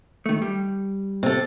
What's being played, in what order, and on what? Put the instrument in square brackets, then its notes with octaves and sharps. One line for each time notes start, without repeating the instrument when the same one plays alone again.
[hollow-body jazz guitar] D#3 A3
G3
[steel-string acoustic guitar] C3 A4